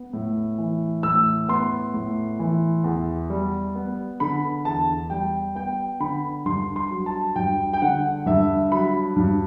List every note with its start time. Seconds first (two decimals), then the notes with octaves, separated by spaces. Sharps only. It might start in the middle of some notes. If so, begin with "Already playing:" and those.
Already playing: B3
0.13 A2
0.58 E3
1.03 A2 E6
1.49 B3 C6
1.94 A2
2.39 E3
2.84 E2
3.30 G3
3.75 B3
4.20 D3 B5
4.65 E2 A5
5.10 G3 G5
5.55 B3 G5
6.00 D3 B5
6.45 G2 C6
6.76 C6
6.91 F#3
7.06 A5
7.36 G2 G5
7.73 G5
7.82 D3 F#5
8.26 G2 E5
8.72 F#3 B5
9.16 G2